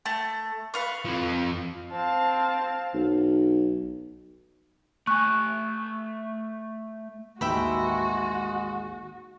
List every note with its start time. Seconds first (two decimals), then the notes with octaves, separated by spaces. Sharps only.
0.06 A3
0.74 B4 F5 C#6
1.05 F2 F3
1.92 C4 F5 A5
2.94 B1
5.07 A3 G#5 C#6 F#6
7.41 A1 D#2 G#3 F#4 B4 E5 G5 B5